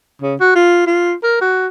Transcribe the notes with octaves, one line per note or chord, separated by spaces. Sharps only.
C#3
F#4
F4
F4
A#4
F#4